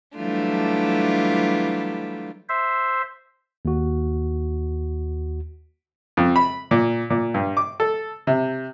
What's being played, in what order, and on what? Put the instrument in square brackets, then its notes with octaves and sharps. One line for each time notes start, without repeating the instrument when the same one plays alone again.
[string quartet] E3 F#3 G3 A3 D4 F4
[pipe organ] C5 E5
[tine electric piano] D#2 F#4
[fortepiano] F2
B5
A#2
A#2
G2
D6
A4
C3